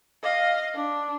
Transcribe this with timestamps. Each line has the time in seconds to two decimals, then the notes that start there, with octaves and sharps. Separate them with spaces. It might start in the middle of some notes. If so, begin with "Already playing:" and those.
0.23 D#5 F5
0.75 D4